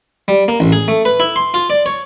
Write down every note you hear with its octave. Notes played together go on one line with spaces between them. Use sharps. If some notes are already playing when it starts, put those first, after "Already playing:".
G3
A#3
A1
G#4
A3
B4
E4
C6
F4
D5
C#5